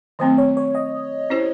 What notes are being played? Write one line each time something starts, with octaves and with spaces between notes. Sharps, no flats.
D#3 F#3 A3 C4 C5
C#5
C#5
D#5
C#4 E4 G4 C5